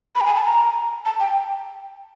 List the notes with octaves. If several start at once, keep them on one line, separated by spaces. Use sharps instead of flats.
B5
G5
G#5
A5
A#5
A5
G5